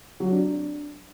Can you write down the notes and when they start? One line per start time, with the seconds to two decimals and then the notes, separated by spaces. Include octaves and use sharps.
0.20 F#3
0.32 D4
0.44 D4